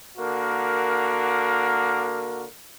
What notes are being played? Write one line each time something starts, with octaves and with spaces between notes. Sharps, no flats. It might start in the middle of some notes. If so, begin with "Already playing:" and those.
D3 A#3 F#4 A#4